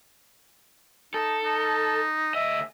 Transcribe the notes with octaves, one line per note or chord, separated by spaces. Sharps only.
D#4 A4
D#4
D2 D#5 E5